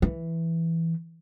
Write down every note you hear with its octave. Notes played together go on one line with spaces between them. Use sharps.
E3